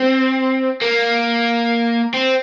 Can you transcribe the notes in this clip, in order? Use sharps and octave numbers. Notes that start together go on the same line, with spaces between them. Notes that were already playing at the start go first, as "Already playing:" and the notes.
Already playing: C4
A#3
C4